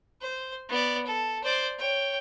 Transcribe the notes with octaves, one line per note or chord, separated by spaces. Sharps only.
C5
B3 D5
A4
C5 D5
C#5 G5